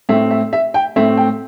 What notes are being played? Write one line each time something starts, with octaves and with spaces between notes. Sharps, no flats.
A2 A3 C4 E5
E5
E5
G5
A2 A3 C4 E5
G5